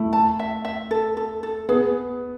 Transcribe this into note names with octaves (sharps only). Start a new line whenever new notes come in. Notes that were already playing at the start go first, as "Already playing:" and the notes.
Already playing: A3 E4
A5
E5
E5
A4
A4
A4
B3 G#4